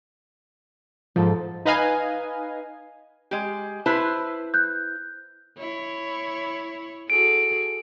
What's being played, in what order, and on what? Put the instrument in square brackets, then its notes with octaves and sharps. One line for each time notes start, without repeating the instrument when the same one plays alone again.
[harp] G#2 A4 [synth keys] F3
[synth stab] D#4 B4 D#5 F5 G#5
[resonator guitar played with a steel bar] G#3 G4
[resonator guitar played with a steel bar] E4 B4 C5 [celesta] A5
[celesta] F#6 G6
[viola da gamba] E4 C#5
[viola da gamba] F#4 G#4 A4 [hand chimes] D7